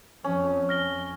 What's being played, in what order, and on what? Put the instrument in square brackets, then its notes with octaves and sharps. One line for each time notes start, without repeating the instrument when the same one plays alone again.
[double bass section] F2 [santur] C#4
[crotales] F6 A#6 G7